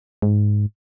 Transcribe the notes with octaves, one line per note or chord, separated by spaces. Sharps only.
G#2